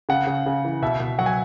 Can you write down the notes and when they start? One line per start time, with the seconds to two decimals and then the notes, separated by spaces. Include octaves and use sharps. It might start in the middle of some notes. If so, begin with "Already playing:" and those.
0.09 C#3 F#5
0.27 C#3
0.46 C#3
0.65 E3
0.82 B2 E5
1.00 B2
1.19 F#3 F#5
1.26 G#5